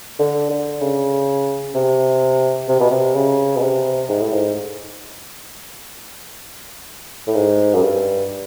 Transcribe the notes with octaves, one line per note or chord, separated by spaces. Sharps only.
D3
D3
C#3
C3
C3
B2
C3
C#3
B2
C3
G#2
A2
G#2
A2
G#2
F#2
G2